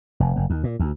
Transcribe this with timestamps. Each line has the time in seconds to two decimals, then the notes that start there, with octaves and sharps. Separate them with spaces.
0.20 F1
0.36 F#1
0.50 D#2
0.64 A#2
0.80 D2